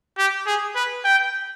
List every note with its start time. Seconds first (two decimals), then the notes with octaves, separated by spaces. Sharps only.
0.18 G4
0.47 G#4
0.76 B4
1.05 G5